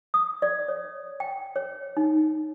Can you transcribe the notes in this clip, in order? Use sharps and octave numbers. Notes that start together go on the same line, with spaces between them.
D#6
D5
C#5
G5
C#5
D#4